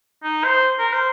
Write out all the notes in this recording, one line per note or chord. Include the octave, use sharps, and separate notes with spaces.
D#4
C5
A#4
C5